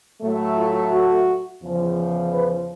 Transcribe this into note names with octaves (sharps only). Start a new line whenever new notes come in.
A2 F#3 A3
F4
F#4
E2 C#3 F3
B4